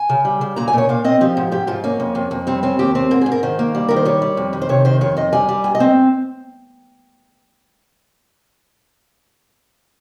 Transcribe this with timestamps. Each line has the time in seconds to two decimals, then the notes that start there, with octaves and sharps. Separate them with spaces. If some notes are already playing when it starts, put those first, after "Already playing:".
Already playing: G#5
0.09 C#3
0.25 G3
0.41 C#3
0.56 A#2 A#5
0.68 G#5
0.73 A#2 C#5
0.89 A#2 F5
1.04 C4 D#5
1.21 F3 G4
1.37 G#2
1.52 G#2 G4
1.67 G#2 F4
1.84 A#3 C#4
2.00 F2
2.15 F2
2.31 F2
2.47 G3 C4
2.63 C4 C#4
2.79 D#2 G4
2.95 C4
3.11 G#2 A#4
3.21 G#2 G#4
3.32 A#4
3.43 D#3 C5
3.59 A#3
3.75 G3
3.89 D#3 A#4
3.96 C5
4.05 G3 C#5
4.22 G3
4.37 F2
4.53 D#3
4.62 C5
4.69 C3 C#5
4.85 D#3 C5
5.01 F2 C#5
5.17 F2 D#5
5.33 G3 G#5
5.49 G3
5.64 G2 G#5
5.75 D#5
5.80 C4